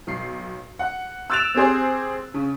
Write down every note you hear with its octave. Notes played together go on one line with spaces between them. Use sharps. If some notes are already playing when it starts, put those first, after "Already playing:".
B1 C7
F#5
E6 F#6 A6 D7 E7 F7
C4 G4 G#4 C5
C#3